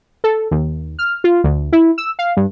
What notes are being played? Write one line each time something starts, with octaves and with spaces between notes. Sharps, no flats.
A4
D#2
F6
F4
D2
E4
E6
F5
G2